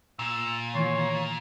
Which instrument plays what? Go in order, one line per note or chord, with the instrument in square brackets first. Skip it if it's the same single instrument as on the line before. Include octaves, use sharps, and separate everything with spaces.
[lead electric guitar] A#2 [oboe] E6
[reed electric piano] D#3 E3 A3 [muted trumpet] C#5 [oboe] C6